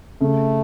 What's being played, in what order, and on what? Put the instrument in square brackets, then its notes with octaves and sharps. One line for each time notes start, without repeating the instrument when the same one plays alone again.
[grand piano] C#3 [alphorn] A3